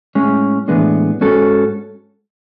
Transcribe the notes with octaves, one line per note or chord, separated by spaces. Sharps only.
A2 G#3 C#4
A2 E3 G#3 B3 D4
G#2 G#3 C#4 F#4 A4